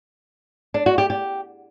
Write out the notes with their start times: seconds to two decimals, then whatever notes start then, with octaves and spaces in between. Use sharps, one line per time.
0.74 D4
0.86 F#4
0.98 G4
1.10 G4